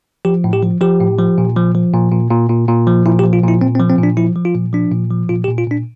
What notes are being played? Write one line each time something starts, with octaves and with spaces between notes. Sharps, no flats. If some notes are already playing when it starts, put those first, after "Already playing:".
F3 G4
A2
G4
F3
F3 G4
A2
F3
A#2
F3
F3
A#2
A#2
A#2
A#2
A#2
F3
A#2 E4
G4
F3
F4
A#2 E4
A#2 C4
C4
F3
C4
A#2
D4
F3 E4
F3
F4
A#2
F3 D4
A#2
F3
A#2 F4
G4
A#2
F4
A#2 D4